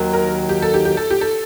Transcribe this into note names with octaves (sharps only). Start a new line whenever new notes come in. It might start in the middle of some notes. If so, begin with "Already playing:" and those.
Already playing: D#2 D#3 F#3
A#4
G4
A4
G4
G4
A4
G4
A4